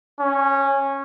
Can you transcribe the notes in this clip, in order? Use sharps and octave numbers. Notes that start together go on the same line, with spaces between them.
C#4